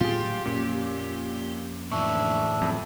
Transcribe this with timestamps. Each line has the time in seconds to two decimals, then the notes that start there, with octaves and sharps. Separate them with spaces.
0.01 A2 F#3 C4 F4 G4 G#4
0.45 F2 A#2 A#3 C#4
1.92 A2 D3 E3 D4 E5 C#6
2.62 F2 F#3